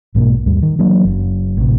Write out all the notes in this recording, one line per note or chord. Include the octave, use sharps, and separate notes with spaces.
B1 G#2 B2 A#3
D#2 G#2 G3
D#3
E3 F#3 A#3 D4
F#1
A1 C3